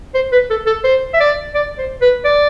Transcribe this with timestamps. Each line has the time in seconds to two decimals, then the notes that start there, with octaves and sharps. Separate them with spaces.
0.15 C5
0.32 B4
0.50 A4
0.66 A4
0.84 C5
1.14 E5
1.20 D5
1.55 D5
1.78 C5
2.01 B4
2.25 D5